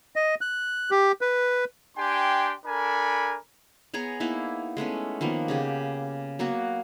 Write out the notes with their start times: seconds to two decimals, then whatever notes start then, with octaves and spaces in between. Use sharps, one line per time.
0.16 D#5
0.41 F#6
0.91 G4
1.21 B4
1.98 D4 G4 G5 G#5 C6
2.65 D4 A4 A#4 G#5 B5
3.94 B3 G#4 C#5 A#5
4.20 A#3 B3 D#4 E4
4.77 G#3 A3 B3 C#4
5.21 D#3 F3 A#3 B3
5.48 C#3 G4 G#4
6.39 F#3 A#3 B3 F#4